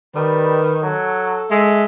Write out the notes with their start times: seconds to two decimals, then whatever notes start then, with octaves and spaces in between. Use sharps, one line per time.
0.15 D#3 G3 B4
0.83 F#3 A4
1.51 G#3 E5